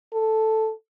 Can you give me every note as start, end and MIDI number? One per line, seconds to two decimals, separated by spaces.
0.13 0.72 69